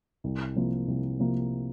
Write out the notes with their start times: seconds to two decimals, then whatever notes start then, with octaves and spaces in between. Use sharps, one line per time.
0.24 C2
0.56 C3 F3 A#3
0.88 C2
1.20 C3 F3 A#3